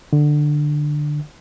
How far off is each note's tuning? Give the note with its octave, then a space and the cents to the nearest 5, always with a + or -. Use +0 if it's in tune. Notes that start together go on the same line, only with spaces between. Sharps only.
D3 +15